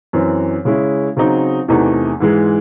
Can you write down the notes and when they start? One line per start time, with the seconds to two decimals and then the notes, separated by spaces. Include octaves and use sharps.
0.13 F#2 E3 C4
0.65 C#3 G#3 C#4 E4
1.17 C#3 F#3 C4 D#4
1.68 E2 C3 E3 A3 D#4
2.20 G#2 E3 G#3